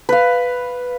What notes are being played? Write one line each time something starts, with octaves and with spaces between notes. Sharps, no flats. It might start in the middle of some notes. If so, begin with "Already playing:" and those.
B4 F5